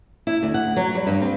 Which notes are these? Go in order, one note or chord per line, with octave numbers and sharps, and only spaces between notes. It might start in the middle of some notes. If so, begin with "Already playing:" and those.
E4
D2
F#5
F#3
G3
G2
C4